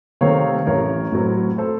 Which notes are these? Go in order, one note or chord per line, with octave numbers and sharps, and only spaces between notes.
C3 D#3 A3 C4 C#5 F5
A1 A#4 C#5
A2 F#3 C4
A4 C5